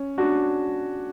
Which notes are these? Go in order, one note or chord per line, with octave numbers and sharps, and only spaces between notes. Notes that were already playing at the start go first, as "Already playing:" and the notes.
Already playing: C#4
D4 F#4